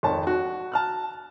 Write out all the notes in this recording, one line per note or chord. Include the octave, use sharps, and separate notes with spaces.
G#1 F2 C#5 A5
F#4
A5 F6 F#6